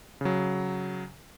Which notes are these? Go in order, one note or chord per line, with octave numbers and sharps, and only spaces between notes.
C#3 F#3